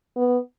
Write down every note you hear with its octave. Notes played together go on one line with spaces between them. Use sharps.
B3